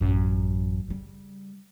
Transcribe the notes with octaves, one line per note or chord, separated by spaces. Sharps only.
A1 F#2
C#3 G3